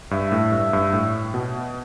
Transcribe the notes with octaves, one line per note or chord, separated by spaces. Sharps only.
G2 E5
A2
G2
G2
A2
B2